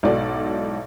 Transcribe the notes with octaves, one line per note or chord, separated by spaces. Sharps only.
B1 G#2 E4 F#4 A4 D5